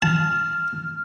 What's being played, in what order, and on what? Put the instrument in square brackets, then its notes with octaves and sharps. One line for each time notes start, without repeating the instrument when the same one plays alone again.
[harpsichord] A5 [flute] F6